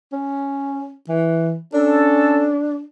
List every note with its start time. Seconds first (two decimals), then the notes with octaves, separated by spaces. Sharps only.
0.13 C#4
1.09 E3
1.74 C#4 D4 A4